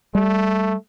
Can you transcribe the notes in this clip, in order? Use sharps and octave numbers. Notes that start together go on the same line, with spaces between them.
G3 A3